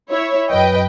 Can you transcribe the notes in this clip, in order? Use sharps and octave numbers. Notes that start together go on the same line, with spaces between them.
E4 C#5 E5
F#2 B4 D#5 G5